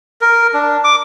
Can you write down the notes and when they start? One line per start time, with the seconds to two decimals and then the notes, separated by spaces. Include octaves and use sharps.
0.21 A#4
0.54 D4
0.84 D6